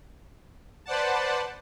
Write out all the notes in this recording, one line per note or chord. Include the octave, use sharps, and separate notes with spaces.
B4 C5 D5 F#5 A5